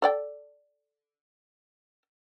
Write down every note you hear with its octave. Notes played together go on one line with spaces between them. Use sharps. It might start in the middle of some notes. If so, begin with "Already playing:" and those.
A4 D5 G5